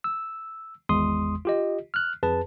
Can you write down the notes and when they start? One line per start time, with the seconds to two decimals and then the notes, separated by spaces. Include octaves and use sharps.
0.04 E6
0.89 G#1 E2 G#3 C6 D#6
1.45 F4 G4 D#5
1.94 F6 F#6
2.23 F2 G#4 B4 A5